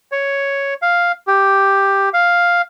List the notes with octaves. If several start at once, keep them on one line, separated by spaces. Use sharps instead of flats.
C#5
F5
G4
F5